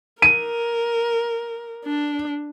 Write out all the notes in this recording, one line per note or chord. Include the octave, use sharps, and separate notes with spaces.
A#4 D#7
D4